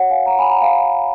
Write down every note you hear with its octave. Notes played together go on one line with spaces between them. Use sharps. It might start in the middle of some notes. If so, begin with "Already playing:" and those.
Already playing: F#4 C#5 F#5
F5 G#5
F#5 A#5
G#5 B5
F#5 A#5
F5 G#5